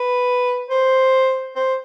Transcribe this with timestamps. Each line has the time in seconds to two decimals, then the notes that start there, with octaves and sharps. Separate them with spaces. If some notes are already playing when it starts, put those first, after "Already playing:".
Already playing: B4
0.70 C5
1.55 C5